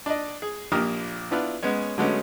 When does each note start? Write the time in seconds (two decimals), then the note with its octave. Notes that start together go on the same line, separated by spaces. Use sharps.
0.06 D4 D5 D#5
0.42 G#4
0.72 A#1 A#2 A#3 G4 D#6 F6
1.31 B3 D4 E4 F4 B4
1.63 G#3 B3 C#4 C#5
1.98 D3 F#3 G#3 A3 B3 C#4